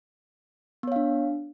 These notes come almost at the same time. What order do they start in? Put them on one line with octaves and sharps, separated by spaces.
B3 C#5 F5 D4